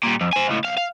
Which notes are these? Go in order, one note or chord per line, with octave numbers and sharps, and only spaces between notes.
A#2 G3
F2
C5 G#5
C#2 A2
B1 F5
F5